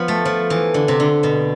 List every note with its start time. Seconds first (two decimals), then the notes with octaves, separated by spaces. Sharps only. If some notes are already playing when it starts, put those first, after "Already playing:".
Already playing: F3 B3
0.08 A3
0.25 F3
0.50 E3
0.74 D3
0.88 C3
1.00 D3
1.23 B2